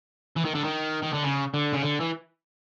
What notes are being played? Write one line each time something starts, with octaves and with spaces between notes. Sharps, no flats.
E3
D#3
D3
D#3
D#3
D3
C#3
D3
C#3
D3
E3